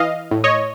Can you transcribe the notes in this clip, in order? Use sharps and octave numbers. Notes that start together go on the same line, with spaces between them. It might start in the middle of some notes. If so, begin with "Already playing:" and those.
Already playing: E3 D#5 F5
A2
C#5 D#5